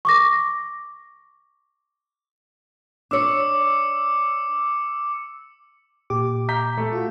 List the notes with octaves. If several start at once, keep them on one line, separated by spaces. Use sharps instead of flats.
C#6 D6 A#6
D4 C#5 D6 E6 C#7
A#2 G4 D6
A#5 G6 B6
A3
F4 F#4